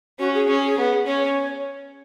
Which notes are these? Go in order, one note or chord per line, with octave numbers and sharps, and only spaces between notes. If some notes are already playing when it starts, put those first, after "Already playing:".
C#4 F#4
G#4
C#4
B3
C#4 C#5